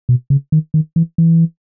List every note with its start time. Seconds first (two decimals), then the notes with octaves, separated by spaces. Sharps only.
0.09 B2
0.30 C#3
0.52 D#3
0.74 D#3
0.96 E3
1.18 E3